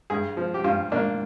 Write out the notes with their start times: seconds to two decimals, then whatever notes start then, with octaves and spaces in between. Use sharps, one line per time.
0.10 G2 G#4
0.37 F3
0.54 G4
0.64 G2 F4
0.92 A#3 D4